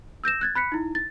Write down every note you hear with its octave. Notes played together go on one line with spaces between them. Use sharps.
E6 G6 A#6 E7
F#6 G#6 A6
B5 F#6 B6 C#7
D#4 E4
A6